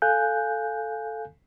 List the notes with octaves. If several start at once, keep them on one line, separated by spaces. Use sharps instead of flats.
A4 F5 G#5 F#6 G6